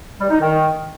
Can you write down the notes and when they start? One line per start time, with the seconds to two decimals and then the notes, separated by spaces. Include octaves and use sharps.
0.20 G3
0.30 D#4
0.40 D#3